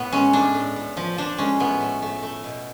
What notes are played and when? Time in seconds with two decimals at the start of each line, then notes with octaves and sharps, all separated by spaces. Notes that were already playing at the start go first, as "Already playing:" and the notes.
Already playing: A2 B3
0.12 G#3 C#4
0.33 A2 D4
0.55 A2
0.76 A2
0.97 F3
1.18 F3 D4
1.38 G#3 C#4
1.60 A2 B3
1.81 A3
2.02 A3
2.23 A3
2.44 B2